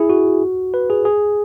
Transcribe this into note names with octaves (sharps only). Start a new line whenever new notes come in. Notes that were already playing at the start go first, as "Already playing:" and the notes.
Already playing: E4 G#4
F#4
B4
G#4
G#4